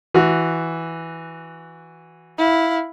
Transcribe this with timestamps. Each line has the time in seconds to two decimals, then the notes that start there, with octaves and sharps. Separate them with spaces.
0.14 E3 F#4
2.38 E4 F5